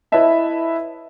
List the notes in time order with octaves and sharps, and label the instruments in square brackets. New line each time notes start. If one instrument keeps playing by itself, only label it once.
[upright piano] E4 B4 C#5 D#5 E5 A5